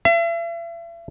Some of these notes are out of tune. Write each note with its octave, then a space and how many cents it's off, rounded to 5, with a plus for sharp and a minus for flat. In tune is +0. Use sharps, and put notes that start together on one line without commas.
E5 +40